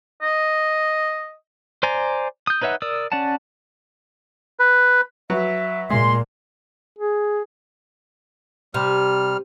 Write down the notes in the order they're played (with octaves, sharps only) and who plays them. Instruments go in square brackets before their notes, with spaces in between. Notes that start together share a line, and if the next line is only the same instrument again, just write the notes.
[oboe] D#5
[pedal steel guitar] C5 D5 G#5 A#5
D#6 G6
D#4 B4 C#5 E5 F#5
A#4 D5 D#6 E6
C#4 D5 F#5 A5
[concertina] B4
[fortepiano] F#3 B4 [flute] E5
[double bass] A#2 [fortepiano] G#3 [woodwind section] C6
[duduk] G#4
[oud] C3 [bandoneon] G3 F6